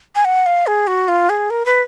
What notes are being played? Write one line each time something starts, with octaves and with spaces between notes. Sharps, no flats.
G#5
F#5
F5
G#4
F#4
F4
G#4
A#4
B4